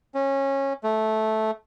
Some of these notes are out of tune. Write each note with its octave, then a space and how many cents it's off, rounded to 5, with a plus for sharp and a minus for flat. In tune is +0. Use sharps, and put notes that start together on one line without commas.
C#4 -20
A3 -10